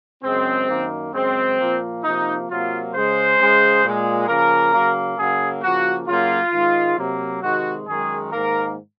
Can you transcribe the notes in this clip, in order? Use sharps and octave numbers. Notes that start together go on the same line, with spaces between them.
F#2 C#3 G#3 C4
F#2 D#3 A#3
F#2 C#3 G#3 C4
A#2 F3 A#3
C3 F3 A#3 D#4
C3 F#3 A#3 F4
C#3 G#3 C5
C#3 G#3
A#2 G#3
C#3 F3 A#3 A#4
C#3 F#3 A#3
C#3 F#3 A#3 G#4
C#3 F3 A#3 F#4
F#2 C#3 F#3 A#3 F4
G#2 D#3 G#3
C3 F#3 A#3
C3 D#3 G#3 F#4
F#2 D#3 G#3 G#4
G#2 D#3 A#3 A#4